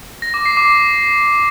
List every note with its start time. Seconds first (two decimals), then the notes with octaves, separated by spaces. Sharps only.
0.22 A#6
0.34 D6
0.45 C7
0.57 D6